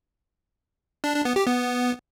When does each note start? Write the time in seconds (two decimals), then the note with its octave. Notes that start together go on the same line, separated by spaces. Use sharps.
1.04 D4
1.15 D4
1.25 B3
1.36 G4
1.47 B3